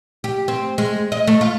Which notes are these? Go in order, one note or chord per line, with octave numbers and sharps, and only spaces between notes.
G4
C4
G#3
D#5
A3
F4